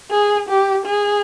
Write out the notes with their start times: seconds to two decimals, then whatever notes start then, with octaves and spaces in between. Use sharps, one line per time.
0.11 G#4
0.49 G4
0.86 G#4